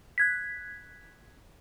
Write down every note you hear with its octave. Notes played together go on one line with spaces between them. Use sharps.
F#6 G#6 B6